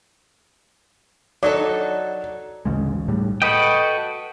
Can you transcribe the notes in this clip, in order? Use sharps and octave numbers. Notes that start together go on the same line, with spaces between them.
F#3 D#4 A4 D5
A1 D2 C#3 G#3
A2 G3
F#4 A4 B4 D#5 G5